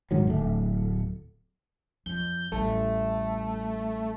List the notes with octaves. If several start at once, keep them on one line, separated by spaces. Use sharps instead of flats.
D#1 G#2 D#3 F#3
D1 A3
F2 G6
A1 G3 A3